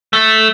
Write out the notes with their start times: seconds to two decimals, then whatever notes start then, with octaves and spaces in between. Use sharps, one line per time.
0.13 A3